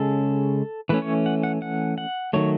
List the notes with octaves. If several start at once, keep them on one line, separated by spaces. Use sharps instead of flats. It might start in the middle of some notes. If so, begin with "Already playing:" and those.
Already playing: C#3 G#3 C#4 A4
E3 A3 C#4 B4
C#5
F#5
F#5
F#5
F#5
D#3 F#3 A3 C#5